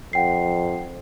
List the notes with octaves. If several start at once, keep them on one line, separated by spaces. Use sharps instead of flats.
F2 F#5 G5 C7